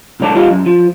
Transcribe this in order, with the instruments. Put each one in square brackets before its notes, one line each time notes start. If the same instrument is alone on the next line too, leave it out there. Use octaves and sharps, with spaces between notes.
[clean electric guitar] B1 G#2 D3 C#5 D5 A5
G3 F4 G4 D#5 F5
F#2
F3